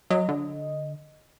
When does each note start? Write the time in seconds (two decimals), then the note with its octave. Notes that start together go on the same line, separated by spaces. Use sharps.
0.10 F#3 D#5
0.29 D3